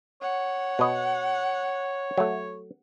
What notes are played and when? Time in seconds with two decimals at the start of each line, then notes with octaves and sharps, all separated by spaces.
0.22 C#5 F#5
0.79 B2 D#5
2.17 F#3 A3